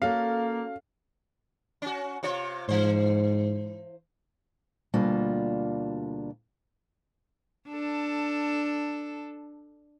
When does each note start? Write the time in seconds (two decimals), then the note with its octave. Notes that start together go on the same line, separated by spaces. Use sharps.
0.02 A#3 C#4 F#4 A4 F5
1.82 C#4 F#4
2.23 C3 F4 C#5
2.69 G#2 E3 C5
4.94 D2 B2 G3 A#3 D4 F4
7.69 D4 A4